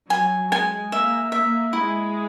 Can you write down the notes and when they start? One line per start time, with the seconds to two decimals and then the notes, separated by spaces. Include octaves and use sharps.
0.10 F#3 G#5
0.51 G#3 G#5
0.92 A#3 E5
1.32 A#3 E5
1.73 G#3 E4